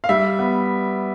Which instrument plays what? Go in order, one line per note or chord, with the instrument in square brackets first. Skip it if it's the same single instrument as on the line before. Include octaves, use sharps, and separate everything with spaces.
[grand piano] F5
G3 E5
B3